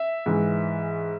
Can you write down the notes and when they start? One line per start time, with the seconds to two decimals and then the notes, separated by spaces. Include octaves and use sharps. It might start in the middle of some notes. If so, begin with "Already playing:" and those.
Already playing: E5
0.26 G#2 E3